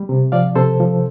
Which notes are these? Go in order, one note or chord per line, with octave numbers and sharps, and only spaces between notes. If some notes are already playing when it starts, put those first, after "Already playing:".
Already playing: G3
C3
F3 D5 F5
C3 A4 C5
F3